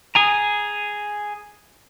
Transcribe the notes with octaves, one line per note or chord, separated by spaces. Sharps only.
G#4 G#5 A#5